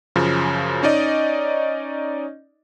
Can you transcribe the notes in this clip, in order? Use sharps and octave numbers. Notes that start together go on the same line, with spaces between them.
F#2 C#3 F3
C#4 D#4 D5 D#5